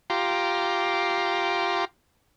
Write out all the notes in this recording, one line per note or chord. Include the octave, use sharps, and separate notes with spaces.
F4 G4 A#5 C6 D6